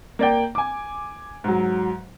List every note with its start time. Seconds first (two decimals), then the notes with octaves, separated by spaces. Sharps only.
0.19 A#3 D5 G5
0.55 G#5 D6
1.44 G#2 F#3